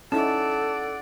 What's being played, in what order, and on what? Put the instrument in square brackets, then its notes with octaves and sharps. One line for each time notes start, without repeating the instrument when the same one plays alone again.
[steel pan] C#4 D#4 E4 [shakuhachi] A4 [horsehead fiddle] D5 F#5 [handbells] A5